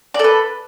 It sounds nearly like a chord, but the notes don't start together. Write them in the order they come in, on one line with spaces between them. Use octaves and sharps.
D5 A4 B4